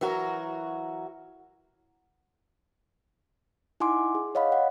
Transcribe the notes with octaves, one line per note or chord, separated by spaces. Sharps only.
E3 F#3 F#4 A#4
D#4 E4 F#5 G#5 C6 D6
G#4
C#5 D#5 F5 F#5 B5
F#5